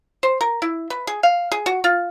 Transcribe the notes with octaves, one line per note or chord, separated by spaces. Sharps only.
C5
A#4
E4
B4
G#4
F5
G#4
F#4
F4